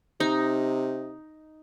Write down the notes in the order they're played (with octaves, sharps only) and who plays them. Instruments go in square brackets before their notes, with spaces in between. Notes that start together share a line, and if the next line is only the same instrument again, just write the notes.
[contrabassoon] C3 [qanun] D#4